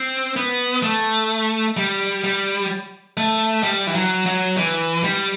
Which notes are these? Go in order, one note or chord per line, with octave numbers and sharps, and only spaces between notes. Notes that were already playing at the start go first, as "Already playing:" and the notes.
Already playing: C4
B3
A3
G3
G3
A3
G3
E3
F#3
F#3
E3
G3